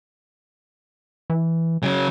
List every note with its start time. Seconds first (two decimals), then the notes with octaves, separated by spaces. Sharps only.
1.30 E3
1.83 C#3 F#3